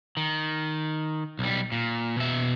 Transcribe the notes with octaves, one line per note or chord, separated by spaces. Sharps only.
D#3
B1 G3
A#2
B2 E5